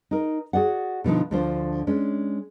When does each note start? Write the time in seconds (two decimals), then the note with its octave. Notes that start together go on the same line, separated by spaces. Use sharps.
0.11 D#4 A#4
0.53 F#4 G#4 D5 F#5
1.04 B2 D3 F3 D#4
1.31 D2 D3 F3 D4 F4 C5
1.87 G#3 C#4 D4